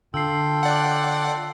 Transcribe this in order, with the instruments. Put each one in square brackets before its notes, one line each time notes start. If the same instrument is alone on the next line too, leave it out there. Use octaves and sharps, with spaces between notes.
[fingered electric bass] D3 [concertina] F4 A4 G5 [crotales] E6 C7
[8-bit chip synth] D5 F#5